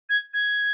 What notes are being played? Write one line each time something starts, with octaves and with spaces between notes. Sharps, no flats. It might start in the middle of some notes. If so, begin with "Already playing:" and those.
G#6
G#6